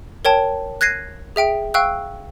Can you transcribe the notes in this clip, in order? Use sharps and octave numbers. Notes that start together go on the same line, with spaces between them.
A#4 C#5 G5 A5
F#6 G#6 A#6 C7 D#7
G#4 E5 G5 D7
F5 G5 C#6 E6 F#6